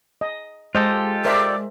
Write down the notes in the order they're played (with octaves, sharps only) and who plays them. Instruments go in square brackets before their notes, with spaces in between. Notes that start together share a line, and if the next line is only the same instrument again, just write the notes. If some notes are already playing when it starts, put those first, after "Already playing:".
[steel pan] D#5
[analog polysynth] G#3 [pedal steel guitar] F4 G4 A4 [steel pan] C5 D#5
[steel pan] A#4 C5 E5 [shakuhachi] D5